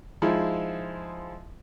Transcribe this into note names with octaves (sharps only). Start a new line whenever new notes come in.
F3 G#3 D#4 E4